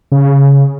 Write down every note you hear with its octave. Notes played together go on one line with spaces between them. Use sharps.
C#3